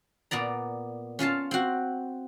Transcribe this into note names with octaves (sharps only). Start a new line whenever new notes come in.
A#2 B3 D5 A#5
C#4 F4 F5 A5
C4 F#4